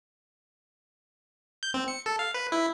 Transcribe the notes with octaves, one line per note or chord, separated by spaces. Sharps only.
G6
C4
C#7
A4
F5
B4
E4